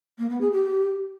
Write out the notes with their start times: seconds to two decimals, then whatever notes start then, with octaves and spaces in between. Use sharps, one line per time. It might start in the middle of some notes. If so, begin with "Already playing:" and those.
0.18 A#3
0.30 B3
0.41 G#4
0.52 G4